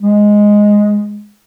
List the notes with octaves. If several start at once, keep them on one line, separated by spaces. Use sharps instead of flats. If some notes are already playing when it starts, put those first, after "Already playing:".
G#3